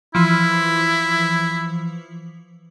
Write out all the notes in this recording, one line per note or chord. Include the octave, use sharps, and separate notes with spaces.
E3 F3 E4